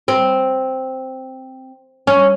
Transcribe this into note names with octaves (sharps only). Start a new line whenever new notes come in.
C4
C#4